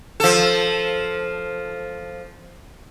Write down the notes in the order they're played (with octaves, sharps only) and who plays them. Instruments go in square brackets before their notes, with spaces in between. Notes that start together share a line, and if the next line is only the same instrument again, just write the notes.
[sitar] F3 A4